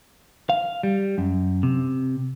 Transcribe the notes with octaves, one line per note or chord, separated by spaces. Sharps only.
F5
G3
F#2
C3